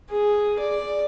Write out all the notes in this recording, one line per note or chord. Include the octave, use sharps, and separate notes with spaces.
G#4
D5